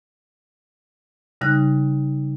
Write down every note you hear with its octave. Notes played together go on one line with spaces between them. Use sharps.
C#3 G3 D#4 F#6